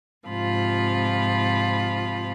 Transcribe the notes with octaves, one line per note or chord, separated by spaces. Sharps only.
G#2 C3 F3 F4 B5